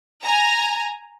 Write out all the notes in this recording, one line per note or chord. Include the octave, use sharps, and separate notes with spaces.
G#5 A#5